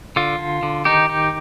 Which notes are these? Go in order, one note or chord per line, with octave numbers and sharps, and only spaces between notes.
D3 F4
D3
D3
D#3 D#4 G4
D#4